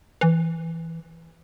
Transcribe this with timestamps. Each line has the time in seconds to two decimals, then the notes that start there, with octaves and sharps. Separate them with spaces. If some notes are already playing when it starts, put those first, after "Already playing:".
0.21 E3